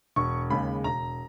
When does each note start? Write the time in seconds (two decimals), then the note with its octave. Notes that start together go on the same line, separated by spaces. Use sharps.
0.16 E1 C#6
0.50 D#2 C#3 G#3 B5
0.84 E1 A#5